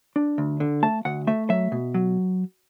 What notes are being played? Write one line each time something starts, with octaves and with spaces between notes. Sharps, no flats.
D4
D2
D3
A3 A5
D2 F#5
A3 E5
F#3 E5
B2
F#3